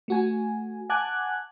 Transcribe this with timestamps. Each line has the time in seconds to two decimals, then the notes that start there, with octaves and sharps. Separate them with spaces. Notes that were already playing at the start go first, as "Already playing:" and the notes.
0.08 A3 F#4 G#5
0.90 F#5 G#5 A5 D6 F#6 G#6